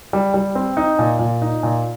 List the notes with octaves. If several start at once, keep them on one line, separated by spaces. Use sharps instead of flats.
G3
G3
C4
D#4
A#2
A#2
D#4
A#2